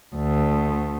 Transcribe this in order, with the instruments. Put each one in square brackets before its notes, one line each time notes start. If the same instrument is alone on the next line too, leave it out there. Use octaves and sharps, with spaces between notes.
[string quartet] D2